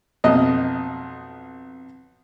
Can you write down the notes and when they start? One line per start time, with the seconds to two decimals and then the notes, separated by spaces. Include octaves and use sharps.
0.24 B1 F2 D#5